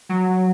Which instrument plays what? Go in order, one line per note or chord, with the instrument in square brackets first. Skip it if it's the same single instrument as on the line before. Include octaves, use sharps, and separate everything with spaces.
[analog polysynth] F#3